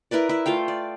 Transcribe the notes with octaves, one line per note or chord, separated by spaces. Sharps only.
E4 A#4 B4 D5
E4 E5
A3 F4 F5 G5
D5